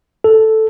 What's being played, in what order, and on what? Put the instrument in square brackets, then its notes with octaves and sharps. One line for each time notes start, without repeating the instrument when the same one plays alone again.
[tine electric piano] A4